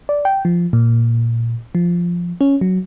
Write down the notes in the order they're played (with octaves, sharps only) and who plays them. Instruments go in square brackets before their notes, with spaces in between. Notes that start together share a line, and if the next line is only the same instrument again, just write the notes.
[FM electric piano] D5
G5
F3
A#2
F3
C#4
F#3